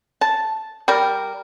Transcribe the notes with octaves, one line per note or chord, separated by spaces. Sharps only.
A5
G3 A#4